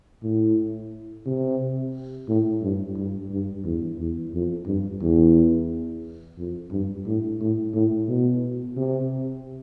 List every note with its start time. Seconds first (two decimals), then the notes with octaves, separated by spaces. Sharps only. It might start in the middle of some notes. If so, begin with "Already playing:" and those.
0.23 A2
1.26 C3
2.28 A2
2.62 G2
2.96 G2
3.31 G2
3.64 E2
3.99 E2
4.34 F2
4.67 G2
5.02 E2
6.38 F2
6.71 G2
7.06 A2
7.41 A2
7.74 A2
8.08 B2
8.77 C3